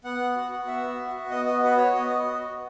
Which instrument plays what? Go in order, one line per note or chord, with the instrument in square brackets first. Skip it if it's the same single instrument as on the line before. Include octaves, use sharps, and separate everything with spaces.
[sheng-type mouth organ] B3 F#5
F#4
B3 E5
F#4
B3 D#5
D#5
F#4 B4
C#5
B3 D#5
F#4